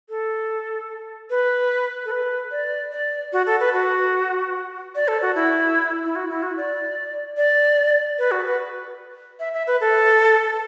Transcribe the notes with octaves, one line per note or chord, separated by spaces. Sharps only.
A4
B4
A4
B4
D5
D5
F#4
A4
B4
F#4
D5
A4
F#4
E4
E4
F#4
E4
F#4
D5
D5
B4
F#4
B4
E5
E5
B4
A4